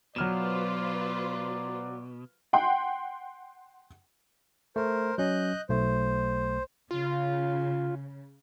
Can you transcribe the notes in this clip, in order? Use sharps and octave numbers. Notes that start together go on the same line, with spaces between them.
B2 F#3 F4 B4 C5 D5 F6 E7
F#5 G5 C6
A3 A#4 C5
F#3 C#4 D#5 F#6 G6
B1 A3 C5
C#3 F4